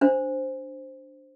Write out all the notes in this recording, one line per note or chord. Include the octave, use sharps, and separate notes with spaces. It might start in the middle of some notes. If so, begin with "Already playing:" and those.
D4 C5